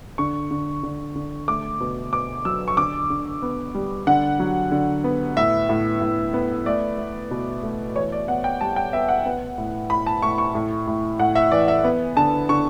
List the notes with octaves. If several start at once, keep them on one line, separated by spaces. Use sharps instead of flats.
D3 C#6
D3
D3
D3
A3 D6
B2
B2 D6
F#3 E6
C#6
D3 D6
D3
B3
G3
D3 F#5
F#3
D3
B3
A2 E5
A2
A2
B3
A3 D5
A3
B2
A3
E3 C#5
D5
B3 F#5
G5
G3 A5
G5
B3 E5
F#5
B3
A2
A2 B5
A5
A2 C#6
C#6
A2
A2
A2 F#5
E5
E3 D5
E5
B3
D3 A5
D3 C#6